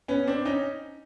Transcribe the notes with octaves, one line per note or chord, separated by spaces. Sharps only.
B3 C#4
C4 D4
C#4 D#4